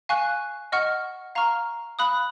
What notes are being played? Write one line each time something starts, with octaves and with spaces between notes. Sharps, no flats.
F5 G#5 C#6 F#6
D#5 F#5 C#6 F6
F5 A#5 C#6 F6
F5 B5 D#6 F#6